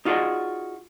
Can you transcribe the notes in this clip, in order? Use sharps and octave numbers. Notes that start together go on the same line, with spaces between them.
D#4 F4 F#4 G#4 D5 D#5